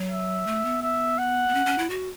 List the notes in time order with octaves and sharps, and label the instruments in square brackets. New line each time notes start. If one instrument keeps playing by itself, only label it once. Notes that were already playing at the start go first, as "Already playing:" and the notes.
Already playing: [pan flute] F#3
[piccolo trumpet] E5
[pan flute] A3
B3
[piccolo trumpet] E5
F#5
[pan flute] B3
C#4
C#4
E4
F#4